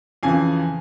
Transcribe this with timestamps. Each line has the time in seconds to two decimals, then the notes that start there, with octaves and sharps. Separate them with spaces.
0.23 F2 C#3 E3 G#5